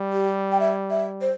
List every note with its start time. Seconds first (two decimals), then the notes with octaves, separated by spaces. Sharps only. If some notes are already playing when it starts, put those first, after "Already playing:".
Already playing: G3
0.13 G4
0.52 G5
0.60 E5
0.90 E5
1.21 C5